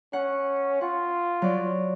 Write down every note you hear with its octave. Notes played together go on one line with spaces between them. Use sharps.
C#4 F#5
F4 F#5
F#3 D5